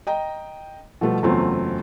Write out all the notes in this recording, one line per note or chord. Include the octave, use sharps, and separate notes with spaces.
D#5 G5 A#5
B2 F3 G3 A3 B3
F#1 E2 F#3 A3 C4 F4